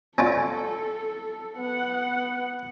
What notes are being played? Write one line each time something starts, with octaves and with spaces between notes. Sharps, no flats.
C#4 D4 F4 A4
B3 F#5